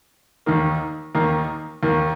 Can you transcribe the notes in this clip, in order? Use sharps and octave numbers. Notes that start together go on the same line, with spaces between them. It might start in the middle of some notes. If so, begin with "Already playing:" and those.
D#2 D#3 A#3
D#2 D#3 A#3
D#2 D#3 A#3